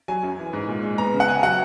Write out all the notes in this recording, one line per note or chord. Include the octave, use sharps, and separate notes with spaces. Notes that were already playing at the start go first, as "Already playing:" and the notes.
F#3 G#5
F#2
E3
G#2
A#2
G#3
B3 A#5
C#3
F#5
C#3 G#5
F#3 F#5